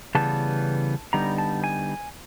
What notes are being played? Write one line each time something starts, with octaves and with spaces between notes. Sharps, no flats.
C#3 E3 G3 B3 A5
D3 G3 B3 D#4 A#5
A5
G#5